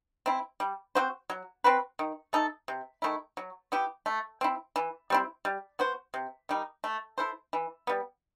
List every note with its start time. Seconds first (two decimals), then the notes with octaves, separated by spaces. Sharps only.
0.26 C4 E4
0.60 G3
0.95 C4 F#4 C5
1.30 F#3
1.64 C4 F#4 B4
1.99 D#3
2.33 A3 D#4 A4
2.68 C3
3.02 D#3 A3 E4
3.37 F#3
3.72 B3 E4 G4
4.06 A3
4.41 C4 E4
4.76 E3
5.10 G3 C4 E4
5.45 G3
5.79 B3 F#4 C5
6.14 C3
6.49 D#3 G3 D#4
6.84 A3
7.18 E4 A4 C5
7.53 E3
7.87 G3 B3